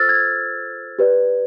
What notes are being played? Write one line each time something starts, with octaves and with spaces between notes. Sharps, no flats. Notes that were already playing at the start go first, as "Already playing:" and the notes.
Already playing: F4 A4 C5 E6 F6 A6
G#6
G4 B4 D5